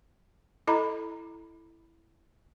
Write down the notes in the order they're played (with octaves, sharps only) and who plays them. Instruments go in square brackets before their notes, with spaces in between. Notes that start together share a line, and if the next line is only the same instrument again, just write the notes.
[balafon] E4 A4 D#5 A#5 B5